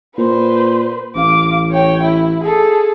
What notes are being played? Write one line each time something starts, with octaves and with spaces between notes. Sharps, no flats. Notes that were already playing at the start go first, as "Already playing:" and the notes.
A#2 B4 C5
A1 F5 D6
C#5 G5
E4
G#4 A4